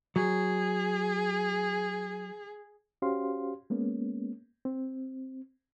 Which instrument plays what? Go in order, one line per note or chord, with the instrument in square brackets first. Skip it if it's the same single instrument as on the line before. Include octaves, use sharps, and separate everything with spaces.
[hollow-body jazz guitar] F#3 [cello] G#4
[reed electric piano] C#4 F#4 G4 C5 F5 C6
G#3 A#3 B3 C#4
C4